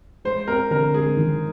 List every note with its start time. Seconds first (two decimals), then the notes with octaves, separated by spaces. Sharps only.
0.25 G#3 C5
0.48 C4 A#4
0.71 D3 A#4
0.94 G#3 G#4
1.17 D#3